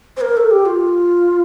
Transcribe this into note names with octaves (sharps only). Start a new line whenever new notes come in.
C5
A#4
A4
G4
F4